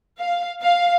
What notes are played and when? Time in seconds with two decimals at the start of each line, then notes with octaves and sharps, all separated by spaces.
0.19 F5
0.63 F5